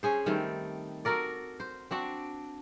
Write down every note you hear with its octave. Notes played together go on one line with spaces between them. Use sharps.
C#4 G#4 C5
D#3 G3 A3 C4
F#4 A4 A#4 D5
C5
C4 D4 F#4